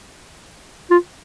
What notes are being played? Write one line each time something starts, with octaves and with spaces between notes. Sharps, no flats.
F4